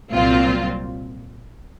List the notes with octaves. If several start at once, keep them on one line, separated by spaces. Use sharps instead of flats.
C2 A#2 F#3 C4 F4